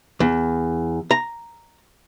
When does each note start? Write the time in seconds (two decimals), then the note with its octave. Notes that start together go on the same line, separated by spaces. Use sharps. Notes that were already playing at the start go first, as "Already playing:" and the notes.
0.20 E2
1.11 A#5